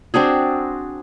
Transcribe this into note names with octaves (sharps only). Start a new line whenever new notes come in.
C4 D4 F#4 G#4